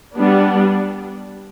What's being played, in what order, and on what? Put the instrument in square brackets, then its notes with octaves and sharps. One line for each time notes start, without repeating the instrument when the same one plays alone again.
[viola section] G3 B3 D4